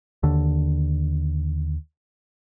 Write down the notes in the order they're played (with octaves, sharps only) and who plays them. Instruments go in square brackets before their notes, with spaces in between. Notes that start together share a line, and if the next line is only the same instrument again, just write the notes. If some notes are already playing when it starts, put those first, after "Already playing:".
[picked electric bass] D#2 D3